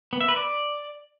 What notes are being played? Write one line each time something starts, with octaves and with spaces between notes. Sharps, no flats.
B3
E5
B4
D5